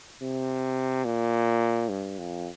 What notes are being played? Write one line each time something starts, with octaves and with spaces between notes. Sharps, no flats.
C3
A#2
G2
F2